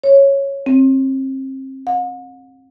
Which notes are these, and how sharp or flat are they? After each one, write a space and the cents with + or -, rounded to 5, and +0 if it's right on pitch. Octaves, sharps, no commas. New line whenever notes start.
C#5 -5
C4 +30
F#5 -45